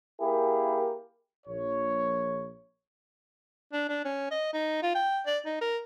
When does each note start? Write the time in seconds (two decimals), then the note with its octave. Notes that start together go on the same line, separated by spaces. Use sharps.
0.20 A#3 E4 G4 G#4 A#4
1.46 A#1 C#5
3.73 D4
3.89 D4
4.05 C#4
4.31 D#5
4.53 D#4
4.82 F4
4.95 G5
5.26 D5
5.46 D#4
5.61 A#4